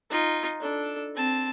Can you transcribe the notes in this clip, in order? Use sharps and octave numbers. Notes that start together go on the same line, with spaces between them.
D#4 F4
D4 A4
C4 A5